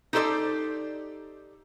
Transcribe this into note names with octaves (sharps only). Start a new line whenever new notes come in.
D#4 G4 A4 C5 D5